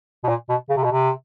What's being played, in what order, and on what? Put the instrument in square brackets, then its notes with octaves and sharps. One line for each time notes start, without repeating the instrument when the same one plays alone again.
[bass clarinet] B2
A#2
B2
C#3
C3
B2
C3